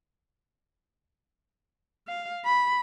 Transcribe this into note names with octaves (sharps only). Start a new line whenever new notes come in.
F5
B5